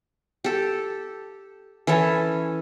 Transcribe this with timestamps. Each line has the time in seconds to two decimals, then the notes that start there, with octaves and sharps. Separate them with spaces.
0.44 G4 A4
1.87 E3 C#4 E4 A4